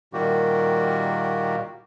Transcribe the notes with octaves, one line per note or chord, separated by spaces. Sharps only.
A#2 D#3 G3 A#3 F#4 G4